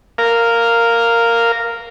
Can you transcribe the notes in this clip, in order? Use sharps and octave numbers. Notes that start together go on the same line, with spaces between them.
A#4 F5